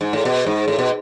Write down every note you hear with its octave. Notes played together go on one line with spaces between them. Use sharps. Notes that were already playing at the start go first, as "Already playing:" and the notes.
G#2
A2
B2
G#2
A2
B2